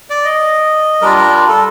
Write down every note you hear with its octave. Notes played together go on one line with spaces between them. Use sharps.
D5
D#5
G3 D4 F4 A#4
A#4
A4